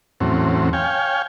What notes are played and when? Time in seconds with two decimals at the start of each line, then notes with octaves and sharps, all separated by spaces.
0.20 E2 A2 F#3 C4 C#4
0.73 C#5 F5 G5 G#5